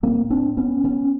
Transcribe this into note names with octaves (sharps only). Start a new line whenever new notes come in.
A2 A#3 C4
C4 D4
B3 C#4
B3 C#4